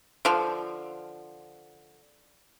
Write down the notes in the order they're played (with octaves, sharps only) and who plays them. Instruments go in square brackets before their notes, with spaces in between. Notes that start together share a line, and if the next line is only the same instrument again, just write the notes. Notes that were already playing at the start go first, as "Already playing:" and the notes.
[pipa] D3 F3